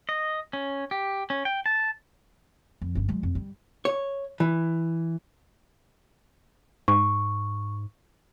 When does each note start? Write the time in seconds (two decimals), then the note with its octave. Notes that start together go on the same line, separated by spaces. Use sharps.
0.09 D#5
0.53 C#4
0.91 G4
1.30 C#4
1.45 G5
1.66 A5
2.82 F2
2.95 G1 C#4
3.09 F#3 G#3
3.23 F2
3.35 G3
3.85 C#5
4.40 E3
6.88 G#2 C#6